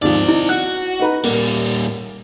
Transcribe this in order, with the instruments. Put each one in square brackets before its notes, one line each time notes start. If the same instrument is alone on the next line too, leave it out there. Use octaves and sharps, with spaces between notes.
[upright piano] D#2 G#2 F3 [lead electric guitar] C4 D5
[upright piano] D#4 [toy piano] E4
[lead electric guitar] F#4 [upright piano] F#6
[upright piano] D#4 B4 A#5
[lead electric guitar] A#2 G3 [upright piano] A#3